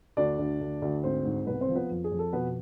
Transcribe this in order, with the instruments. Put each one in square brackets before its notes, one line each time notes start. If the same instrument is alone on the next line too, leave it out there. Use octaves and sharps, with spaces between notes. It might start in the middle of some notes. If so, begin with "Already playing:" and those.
[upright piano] D2 D4 D5
D2
D2
D2
G#2 C4 C5
G#2
C2 B3 B4
C4 C5
F3
B3 B4
F2
G#4
F2
A4
B2 B3 B4